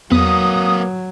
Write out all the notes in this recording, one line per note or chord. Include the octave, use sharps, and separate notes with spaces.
E2 F#3 A#3 B4 D#6